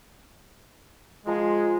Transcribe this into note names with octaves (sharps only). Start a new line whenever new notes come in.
F3 G#3 A#5 C6